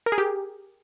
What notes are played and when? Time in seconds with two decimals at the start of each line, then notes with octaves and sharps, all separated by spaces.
0.06 A#4
0.12 G#4
0.18 G4